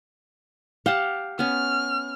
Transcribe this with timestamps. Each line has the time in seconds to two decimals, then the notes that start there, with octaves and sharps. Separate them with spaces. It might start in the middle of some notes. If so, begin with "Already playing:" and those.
0.86 G4 F5 F#5 A5
1.39 B3 C#4 F6